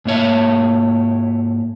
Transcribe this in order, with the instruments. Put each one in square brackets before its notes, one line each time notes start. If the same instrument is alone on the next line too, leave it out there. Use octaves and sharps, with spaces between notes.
[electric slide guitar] G#2 A#3 C#5 E5